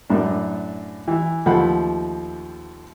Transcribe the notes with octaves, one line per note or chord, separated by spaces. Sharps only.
F#2 A2 D4
E3 E5
D#2 F3 A3 F#5 B5